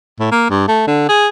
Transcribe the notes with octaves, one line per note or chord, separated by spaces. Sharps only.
A2
A#3
G2
A3
D3
G#4